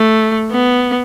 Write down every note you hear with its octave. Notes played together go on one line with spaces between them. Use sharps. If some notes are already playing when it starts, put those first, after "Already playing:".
Already playing: A3
B3